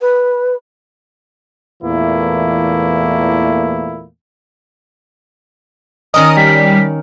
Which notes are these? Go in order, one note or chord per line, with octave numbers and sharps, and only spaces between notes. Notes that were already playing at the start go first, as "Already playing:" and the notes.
B4
E2 A#2 E3 A3 A#3 E4
D#3 C#4 A#4 D#5 D#6
G3 B6